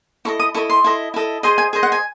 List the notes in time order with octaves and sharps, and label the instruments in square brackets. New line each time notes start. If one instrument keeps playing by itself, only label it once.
[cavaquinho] E4 A4 D#5 C#6
D#6
E4 A4 D#5 C#6
C6
E4 A4 D#5
E4 A4 D#5
G#4 C5 D#5 C6
G#5
G#4 C5 D#5
F#5
G#5